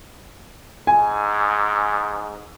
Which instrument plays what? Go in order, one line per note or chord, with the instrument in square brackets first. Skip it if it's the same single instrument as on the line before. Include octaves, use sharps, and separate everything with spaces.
[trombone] G#2 [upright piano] G#5